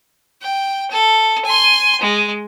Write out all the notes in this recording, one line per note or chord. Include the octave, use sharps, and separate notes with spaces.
G5
A4
G#5 C6
G#3